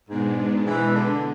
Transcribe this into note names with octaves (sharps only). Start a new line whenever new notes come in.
G#2 B2 G#3 B3 D4
E3
D3